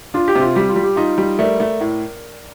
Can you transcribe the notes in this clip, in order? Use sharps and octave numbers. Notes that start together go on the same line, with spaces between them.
D4 F4
G4
C3
F4
G3 G4
F4
G3
G4
D#4 F4
G3
A3 A#4 D5
A3
A2